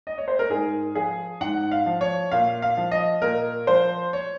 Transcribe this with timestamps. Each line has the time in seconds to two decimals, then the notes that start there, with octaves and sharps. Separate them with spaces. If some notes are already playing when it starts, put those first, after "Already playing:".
0.07 D#5
0.18 C#5
0.28 C5
0.39 A#4
0.50 G#2 G#4
0.95 F3 G#4
1.41 G#2 F#5
1.71 F5
1.86 F3
2.01 C#5
2.31 A#2 F5
2.62 F5
2.77 F3
2.91 D#5
3.22 A#2 A#4
3.67 F3 C5
4.13 C#5